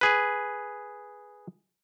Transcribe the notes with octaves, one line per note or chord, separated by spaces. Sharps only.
G#4 B4